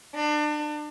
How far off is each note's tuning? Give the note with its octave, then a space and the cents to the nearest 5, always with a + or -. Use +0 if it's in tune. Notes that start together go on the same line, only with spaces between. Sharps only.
D4 +30